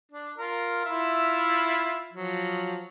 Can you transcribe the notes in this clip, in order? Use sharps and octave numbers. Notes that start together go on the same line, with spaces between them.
D4
F4 A#4
E4 F4 E5
F3 F#3